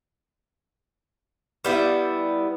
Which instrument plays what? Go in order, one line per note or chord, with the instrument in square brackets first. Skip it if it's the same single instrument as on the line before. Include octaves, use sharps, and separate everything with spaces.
[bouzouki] G3 B3 E4